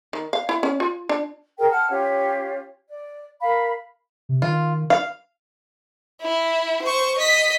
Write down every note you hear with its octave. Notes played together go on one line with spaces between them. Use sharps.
D#3
F5
E4
C#4
F4
D4
G#4 A#4 G5
F#5 A5 F6
C#4 F4 G4 C#5
D5
A#4 F5 B5
C3
D#3 F4
F5
E4
C5 C#6
D#5 B6